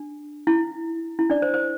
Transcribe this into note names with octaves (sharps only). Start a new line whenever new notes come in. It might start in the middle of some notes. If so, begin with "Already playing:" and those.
Already playing: D4
E4
E4
D4 D5
C5
C5